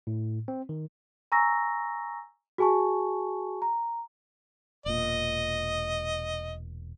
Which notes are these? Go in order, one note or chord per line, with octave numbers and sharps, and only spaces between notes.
A2
C4
D#3
G#5 A#5 C#6 E6 A#6
F#4 G#4 G#5 A5 C#6
A#5
E1 A#2 D#5